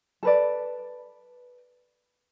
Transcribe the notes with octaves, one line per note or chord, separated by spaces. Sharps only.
A4 B4 D5